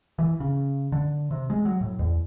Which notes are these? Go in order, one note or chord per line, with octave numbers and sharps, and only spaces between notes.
E3
C#3
D3
C3
G#3
F#3
A2
E2